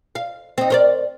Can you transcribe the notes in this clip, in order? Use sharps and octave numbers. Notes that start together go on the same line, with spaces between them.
F5
C4 D#4
A#4 C5 D5